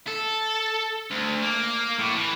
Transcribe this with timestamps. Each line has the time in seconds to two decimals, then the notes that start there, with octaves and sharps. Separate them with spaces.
0.08 A4
1.11 D2
1.42 A#3
1.99 A2
2.14 E3